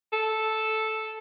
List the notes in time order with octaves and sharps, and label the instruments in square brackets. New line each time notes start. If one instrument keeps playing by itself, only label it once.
[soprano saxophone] A4